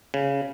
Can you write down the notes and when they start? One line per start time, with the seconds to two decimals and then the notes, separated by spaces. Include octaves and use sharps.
0.14 C#3